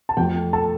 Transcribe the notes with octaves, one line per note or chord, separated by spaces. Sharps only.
A5
F2 F3 A3 G4 G5
A4 A5